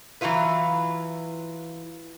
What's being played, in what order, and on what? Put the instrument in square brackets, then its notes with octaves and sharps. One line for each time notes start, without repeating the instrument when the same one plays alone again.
[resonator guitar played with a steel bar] E3 F#3 E4 F4 B4